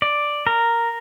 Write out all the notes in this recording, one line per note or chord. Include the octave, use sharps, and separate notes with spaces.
D5
A#4